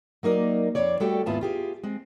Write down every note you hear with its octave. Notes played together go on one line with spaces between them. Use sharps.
F#3 A#3 D#4 A#4 D5
F2 C4 C#5 D5
G3 A3 F#4 G4 A4 G5
D#2 G#2 B3 E4 F4 A5
F4 G4 G#4
G#3 C4